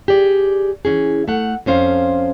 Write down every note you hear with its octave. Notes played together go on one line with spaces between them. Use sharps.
G4 G#4 D5
E3 C#4 G#4
A3 F#5
F2 C#4 C5 F5